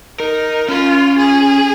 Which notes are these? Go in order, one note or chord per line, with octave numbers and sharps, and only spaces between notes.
D#4 A#4
C#4 F4
G#4